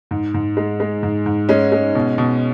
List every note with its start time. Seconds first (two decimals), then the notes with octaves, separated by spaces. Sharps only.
0.11 G#2
0.34 G#2
0.57 G#3
0.80 G#3
1.03 G#2
1.26 G#2
1.49 G#3 C#4
1.72 G#3
1.95 B2
2.18 B2